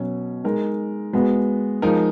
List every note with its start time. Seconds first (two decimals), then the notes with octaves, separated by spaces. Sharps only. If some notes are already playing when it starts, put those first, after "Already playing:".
Already playing: B2 F#3 C#4
0.44 G#3 D#4 A#4
1.13 G#3 B3 F#4
1.82 F3 G#3 D#4 A#4